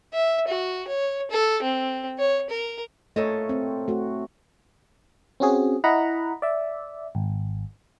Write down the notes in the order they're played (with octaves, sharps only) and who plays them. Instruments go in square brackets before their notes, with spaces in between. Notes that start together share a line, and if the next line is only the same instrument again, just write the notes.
[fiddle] E5
F#4
C#5
A4
C4
C#5
A#4
[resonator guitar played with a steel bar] A#2 A4 D#5 [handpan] A3 C#5
[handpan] C4
A3 F#4
[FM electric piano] C4 C#4 F#4 G#4
E4 D#5 F#5 A#5 B5
D5 E5
G#1